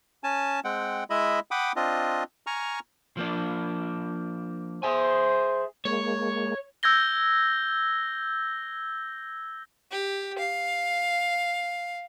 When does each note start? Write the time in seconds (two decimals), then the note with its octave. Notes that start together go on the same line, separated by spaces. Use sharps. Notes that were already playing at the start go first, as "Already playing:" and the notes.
0.24 C#4 G#5 A5
0.64 G#3 C4 F#5 G5
1.10 G#3 E4 D#5 E5 B5
1.51 F#5 G5 B5 D6 D#6
1.76 C4 D4 F4 D#5
2.47 G#5 A#5 C#6 F6
3.17 F3 A#3 D4
4.83 G#4 C5 E5 G#5
5.85 G#3 A#3 C#5
6.83 E6 G6 G#6 A#6 G7
9.91 G4
10.38 F5